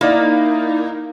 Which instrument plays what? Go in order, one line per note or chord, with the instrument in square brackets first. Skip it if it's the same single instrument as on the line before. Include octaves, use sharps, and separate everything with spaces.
[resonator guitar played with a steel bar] A#3 [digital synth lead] D#4 [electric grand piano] E4 D5 D#5